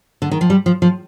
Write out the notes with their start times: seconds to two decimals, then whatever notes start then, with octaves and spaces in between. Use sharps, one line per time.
0.22 D3
0.31 D#3
0.41 F3
0.50 G3
0.66 F3
0.82 F3